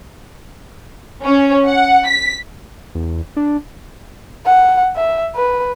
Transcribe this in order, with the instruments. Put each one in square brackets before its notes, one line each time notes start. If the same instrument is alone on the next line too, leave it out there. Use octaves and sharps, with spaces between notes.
[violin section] C#4
F#5
B6
[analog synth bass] E2
D4
[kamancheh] F#5
E5
B4